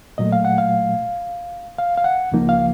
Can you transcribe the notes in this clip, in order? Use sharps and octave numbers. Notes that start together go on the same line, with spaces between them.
A#2 F#3 A3 D#5
F5
F#5
F5
F5
F5
F#5
C#2 C#3 F3 A#3 D#4
F5